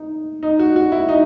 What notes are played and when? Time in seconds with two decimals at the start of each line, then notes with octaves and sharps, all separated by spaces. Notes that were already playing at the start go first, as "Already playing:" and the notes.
Already playing: D#4
0.43 D#4
0.59 F#4
0.76 F#4
0.92 E4
1.09 D#4